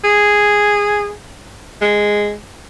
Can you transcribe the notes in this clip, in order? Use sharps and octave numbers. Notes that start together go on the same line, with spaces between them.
G#4
G#3